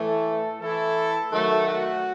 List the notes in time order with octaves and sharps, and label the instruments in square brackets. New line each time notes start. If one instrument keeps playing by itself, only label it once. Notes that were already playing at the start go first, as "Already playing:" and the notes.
Already playing: [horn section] A2 E3 A3 [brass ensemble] A4
[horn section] E3 A3 E4 [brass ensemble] A4
[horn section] D#3 F#3 A3 [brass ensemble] A4
[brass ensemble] F#4